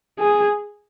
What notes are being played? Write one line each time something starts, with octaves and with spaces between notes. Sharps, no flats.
G#4